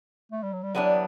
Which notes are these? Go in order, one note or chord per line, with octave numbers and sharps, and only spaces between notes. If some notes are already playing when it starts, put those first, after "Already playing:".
A3
G3
F#3
G3
E3 F#3 G3 B3 D4